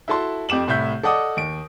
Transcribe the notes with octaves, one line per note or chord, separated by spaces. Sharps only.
E4 F#4 A4 A5 C6
F2 G4 D6 E7 F#7
C2 A2 E5 G6
A4 D5 D#5 F#5 D6 D#6
D#2 D7